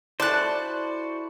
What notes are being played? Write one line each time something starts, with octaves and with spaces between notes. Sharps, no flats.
E4 F#4 A4 C5 D5 A5 C6 F#6